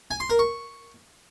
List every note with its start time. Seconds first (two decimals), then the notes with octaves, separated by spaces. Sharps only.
0.11 G#5
0.20 C6
0.30 A#4
0.39 C#6